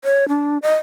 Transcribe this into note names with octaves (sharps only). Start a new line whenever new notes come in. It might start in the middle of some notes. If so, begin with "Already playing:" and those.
C#5
D4
D#5